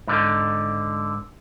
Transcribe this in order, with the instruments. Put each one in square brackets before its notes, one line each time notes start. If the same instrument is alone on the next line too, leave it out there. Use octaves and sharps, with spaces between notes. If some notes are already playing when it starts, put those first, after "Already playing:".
[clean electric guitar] G#2 D3